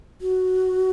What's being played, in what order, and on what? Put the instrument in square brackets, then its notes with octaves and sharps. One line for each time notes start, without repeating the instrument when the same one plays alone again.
[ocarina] F#4